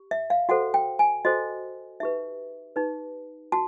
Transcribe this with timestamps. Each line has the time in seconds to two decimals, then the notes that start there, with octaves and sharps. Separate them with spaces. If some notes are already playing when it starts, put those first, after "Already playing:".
Already playing: G4
0.11 E5
0.30 F5
0.49 F#4 A4 C5 F#5
0.74 G5
0.99 G#5
1.25 F#4 A4 C5 D#5
2.00 D#4 G4 B4 E5
2.76 D#4 G4 B4
3.52 F#4 A5